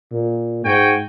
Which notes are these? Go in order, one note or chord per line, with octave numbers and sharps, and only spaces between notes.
A#2
G#2 F#4 G5 G#5